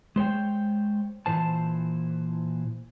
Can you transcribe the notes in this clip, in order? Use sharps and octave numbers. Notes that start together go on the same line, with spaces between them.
G#3 C5 C#5 G5
A#2 E3 C5 A5